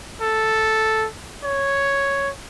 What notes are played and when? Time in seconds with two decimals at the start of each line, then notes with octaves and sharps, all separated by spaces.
0.22 A4
1.44 C#5